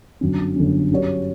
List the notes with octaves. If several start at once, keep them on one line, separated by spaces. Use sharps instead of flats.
G1 F#2 D3 F#3 C#4
G1 F#2 D3 F#3 C#4
G2 F#3 C#4 G4 C#5